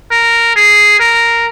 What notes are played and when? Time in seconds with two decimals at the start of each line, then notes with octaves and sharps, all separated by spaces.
0.11 A#4
0.56 G#4
1.00 A#4